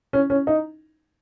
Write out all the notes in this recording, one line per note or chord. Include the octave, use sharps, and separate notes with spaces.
C#4
C#4
D#4